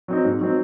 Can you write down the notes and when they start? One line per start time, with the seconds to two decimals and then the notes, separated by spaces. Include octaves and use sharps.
0.08 F#3 C4 D#4
0.25 G#2
0.41 F#3 C4 D#4